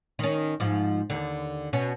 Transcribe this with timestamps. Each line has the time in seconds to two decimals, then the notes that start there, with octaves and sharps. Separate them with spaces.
0.19 D#3 C#4
0.60 G#2 F3
1.10 D#2 D3
1.73 B2 C#4